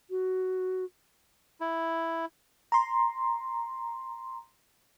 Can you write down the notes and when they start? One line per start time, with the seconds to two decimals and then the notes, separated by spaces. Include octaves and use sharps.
0.10 F#4
1.60 E4
2.72 A#5 C6